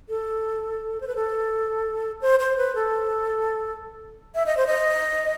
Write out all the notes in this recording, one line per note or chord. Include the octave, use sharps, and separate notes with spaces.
A4
C5
B4
A4
C5
C5
B4
A4
E5
D#5
C5
D#5